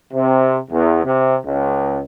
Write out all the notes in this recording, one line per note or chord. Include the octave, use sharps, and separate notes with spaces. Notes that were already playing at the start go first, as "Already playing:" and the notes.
C3
E2
C3
C#2